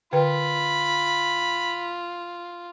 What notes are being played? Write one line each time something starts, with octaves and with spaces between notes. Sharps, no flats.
D3 F4 B4 G5 B5